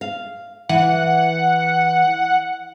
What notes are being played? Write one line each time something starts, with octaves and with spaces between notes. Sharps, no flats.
F5
E3 F#5